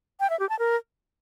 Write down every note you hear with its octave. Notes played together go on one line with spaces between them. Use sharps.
G5
E5
G4
A5
A#4